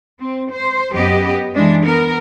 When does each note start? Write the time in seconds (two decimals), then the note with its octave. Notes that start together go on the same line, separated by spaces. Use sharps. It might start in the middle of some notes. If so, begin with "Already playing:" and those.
0.18 C4
0.51 C5
0.92 F#2 B3 G4 D#5
1.54 E3 G#3 D4
1.83 B3 A#4